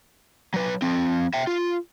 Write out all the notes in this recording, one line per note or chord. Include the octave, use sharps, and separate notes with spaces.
F#3 B4
F3 C4
E5 G5
F4